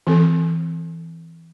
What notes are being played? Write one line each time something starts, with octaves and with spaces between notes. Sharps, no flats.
E3 C4 A4